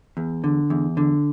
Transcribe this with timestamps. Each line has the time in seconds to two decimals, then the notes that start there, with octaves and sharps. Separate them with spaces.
0.17 E2
0.44 D3
0.70 E2
0.97 D3